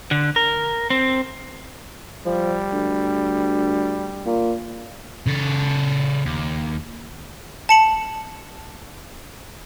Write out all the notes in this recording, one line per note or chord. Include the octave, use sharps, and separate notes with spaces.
D3
A#4
C4
F3 G3
D2
A#2
C#3 A4
D#2
A5 C#7 F#7